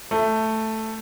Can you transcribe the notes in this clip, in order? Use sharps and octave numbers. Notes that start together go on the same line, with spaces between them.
A3